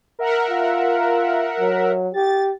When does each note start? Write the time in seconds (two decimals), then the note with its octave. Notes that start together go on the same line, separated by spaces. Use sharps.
0.19 A#4 E5 F#5
0.50 F4
1.60 F#3
2.14 G4 A6